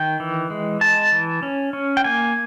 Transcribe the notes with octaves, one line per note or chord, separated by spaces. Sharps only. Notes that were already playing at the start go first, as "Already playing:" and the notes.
Already playing: D#3 G5
E3
G#3
G#3 A5
E3
C#4
C#4
G5
A#3 G#5